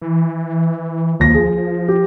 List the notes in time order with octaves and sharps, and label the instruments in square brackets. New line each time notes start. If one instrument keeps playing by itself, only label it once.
[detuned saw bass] E3
[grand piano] D#2 A#6 [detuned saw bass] F3
[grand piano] G#4
G4